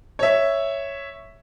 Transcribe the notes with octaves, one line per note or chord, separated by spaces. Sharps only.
C#5 E5